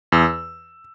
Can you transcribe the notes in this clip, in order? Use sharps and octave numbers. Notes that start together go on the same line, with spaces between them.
E2 E6